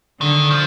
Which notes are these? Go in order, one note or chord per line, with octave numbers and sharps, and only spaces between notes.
D3 D#3
F3